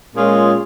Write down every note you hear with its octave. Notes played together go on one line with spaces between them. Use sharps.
A#2 G#3 C#4 F4 G#4